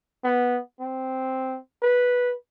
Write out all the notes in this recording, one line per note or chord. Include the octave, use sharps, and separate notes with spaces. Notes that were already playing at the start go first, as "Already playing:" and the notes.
B3
C4
B4